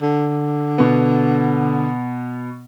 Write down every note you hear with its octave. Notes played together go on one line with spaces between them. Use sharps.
D3
B2 B3